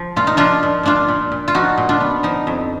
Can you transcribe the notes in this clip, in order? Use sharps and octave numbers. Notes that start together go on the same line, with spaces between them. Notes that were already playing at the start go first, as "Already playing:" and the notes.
Already playing: F3
A#2 F4
D#4
F3 D4 F4
A#2
A#2 D4 F4
A#2
A#2
F4
F3 D#4 F#4
A#2
D4 F4
B3
F3 D#4
F2